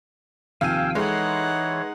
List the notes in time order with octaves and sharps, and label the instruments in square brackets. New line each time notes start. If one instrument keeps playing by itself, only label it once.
[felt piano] D#2 C3 F3 [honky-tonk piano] F5 D#7 [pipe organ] G5 G#5 E6
[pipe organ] E3 C#5 [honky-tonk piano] G#3 [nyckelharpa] D#4 F#5 [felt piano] A4